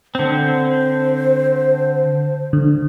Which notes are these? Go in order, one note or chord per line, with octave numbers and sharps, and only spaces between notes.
D3 C4 C5
D3